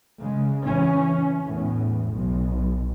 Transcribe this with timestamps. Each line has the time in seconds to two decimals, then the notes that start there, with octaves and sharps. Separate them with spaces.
0.21 C#3 G#3
0.64 E3 C#4
1.43 E2 A2
2.09 B1